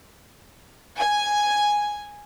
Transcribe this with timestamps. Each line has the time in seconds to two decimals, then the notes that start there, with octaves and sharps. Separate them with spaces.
0.98 G#5